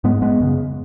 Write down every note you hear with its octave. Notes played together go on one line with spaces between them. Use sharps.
G#2 G#3 B3
G#3 B3
F#2 C#3